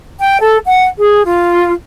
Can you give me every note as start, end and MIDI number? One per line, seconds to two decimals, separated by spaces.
0.19 0.38 79
0.40 0.58 69
0.66 0.87 78
0.98 1.23 68
1.25 1.72 65